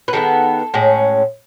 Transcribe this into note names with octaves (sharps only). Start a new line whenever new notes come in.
B4
D#3 G#3 B3 A4
A2 G#3 C#4